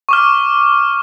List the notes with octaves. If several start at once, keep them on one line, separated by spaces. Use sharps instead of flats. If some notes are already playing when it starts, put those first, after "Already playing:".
C#6 D6 F6